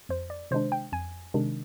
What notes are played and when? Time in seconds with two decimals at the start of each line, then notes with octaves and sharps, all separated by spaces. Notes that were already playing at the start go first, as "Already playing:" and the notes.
0.09 F2 C5
0.30 D5
0.51 C3 D#3 G#3 D4 C5
0.72 G5
0.92 F2 G#5
1.34 C3 D#3 G#3 D4